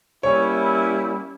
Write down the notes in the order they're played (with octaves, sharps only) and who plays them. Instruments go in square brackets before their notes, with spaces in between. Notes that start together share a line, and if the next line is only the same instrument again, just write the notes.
[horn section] G3 A#3 C#4 E4 [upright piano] C#5